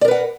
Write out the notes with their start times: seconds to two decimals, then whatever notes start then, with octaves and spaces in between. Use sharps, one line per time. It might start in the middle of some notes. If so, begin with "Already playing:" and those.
0.01 D5
0.05 A#4
0.08 B4
0.11 F#5